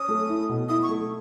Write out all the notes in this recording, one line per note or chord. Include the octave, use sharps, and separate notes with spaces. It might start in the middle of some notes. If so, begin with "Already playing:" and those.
Already playing: C#4 D#6
A3
E4
B2
E4 D#6
C#6
A3